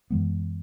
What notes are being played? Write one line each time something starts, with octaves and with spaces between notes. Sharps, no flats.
F#2 E3 G#3 B3